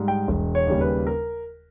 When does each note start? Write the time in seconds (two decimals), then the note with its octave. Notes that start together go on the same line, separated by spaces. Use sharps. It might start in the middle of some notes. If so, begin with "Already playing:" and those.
Already playing: G#2 G3
0.08 G5
0.28 E1
0.55 C#5
0.67 D#2 C#3 G3
0.81 B4
1.07 A#4